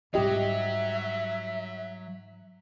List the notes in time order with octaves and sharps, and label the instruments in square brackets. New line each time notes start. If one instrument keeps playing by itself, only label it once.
[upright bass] G#2 G3 [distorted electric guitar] F#3 [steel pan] G4 D#5 [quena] E5